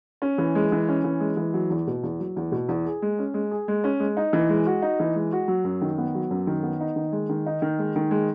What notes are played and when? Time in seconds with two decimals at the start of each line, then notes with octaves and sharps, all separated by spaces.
0.22 C#4
0.38 E3
0.55 G#3
0.72 E3
0.89 C#4
1.04 E3
1.20 G#3
1.37 E3
1.54 F#3
1.70 E2
1.87 B2
2.03 E2
2.20 F#3
2.36 E2
2.52 B2
2.69 E2
2.85 G#4
3.02 G#3
3.19 C#4
3.34 G#3
3.51 G#4
3.68 G#3
3.84 C#4
4.00 G#3
4.17 D#4
4.33 E3
4.49 G#3
4.66 F#4
4.82 D#4
5.00 E3
5.16 G#3
5.33 F#4
5.48 F#3
5.64 F#2
5.81 D#3
5.98 B3
6.15 F#3
6.31 F#2
6.47 D#3
6.63 B3
6.81 D#4
6.96 D#3
7.12 G#3
7.29 D#3
7.46 D#4
7.62 D#3
7.79 G#3
7.96 D#3
8.11 G#3